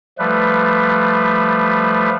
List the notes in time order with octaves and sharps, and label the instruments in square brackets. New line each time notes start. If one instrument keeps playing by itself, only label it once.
[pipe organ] F3 G3 A3 B4